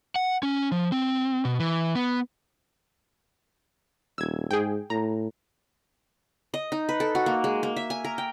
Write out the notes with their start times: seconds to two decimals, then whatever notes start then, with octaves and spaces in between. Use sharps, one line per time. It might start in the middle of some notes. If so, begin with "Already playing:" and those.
0.16 F#5
0.43 C#4
0.72 F3
0.92 C4
1.45 B2
1.60 E3
1.95 B3
4.18 D#1 E6 G#6
4.51 G#2 G#4 G5
4.90 A2 A#5
6.54 D#5
6.72 D#4
6.89 B4
7.00 A4
7.15 F#4
7.26 A#3
7.44 G#3
7.63 A#3
7.77 E5
7.90 G#5
8.05 A#4
8.18 G5